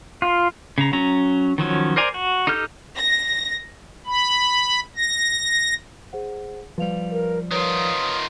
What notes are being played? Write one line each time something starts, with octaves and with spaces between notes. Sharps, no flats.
F4
C#3 A#5
F#3 C#4 A#5
D#3 F3 F#3 C#4
A#4 C5 D5 G#5 A#5
F#4
D#4 G4 A4 F6 G6
A#6
B5
A#6
G#4 C5 F#5
F3 G3 B4 F5 F7
A#4
D#3 F4 A#4 B4 C#5 D#6